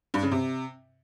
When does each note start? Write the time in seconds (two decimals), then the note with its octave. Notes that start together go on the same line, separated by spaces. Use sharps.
0.14 G2
0.23 C#3
0.31 C3